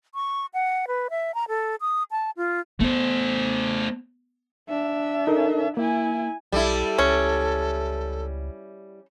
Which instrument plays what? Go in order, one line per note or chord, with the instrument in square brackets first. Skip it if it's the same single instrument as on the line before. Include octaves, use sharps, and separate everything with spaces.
[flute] C#6
F#5
B4
E5
A#5
A4
D#6
A5
F4
[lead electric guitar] A3 C5 [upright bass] B3
[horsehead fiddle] D4 E5
[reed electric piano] D#4 A4 A#4
[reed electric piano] A#3 [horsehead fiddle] E4 G#5
[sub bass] B1 [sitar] G3 E4 [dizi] A4
[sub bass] C#2 [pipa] C#4